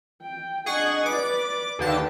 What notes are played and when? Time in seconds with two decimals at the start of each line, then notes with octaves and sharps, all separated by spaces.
0.23 G5
0.66 D4 G#4 D#5 F#5 C#6
1.06 B4 D5 D6
1.79 D#2 D3 B4 G5 A5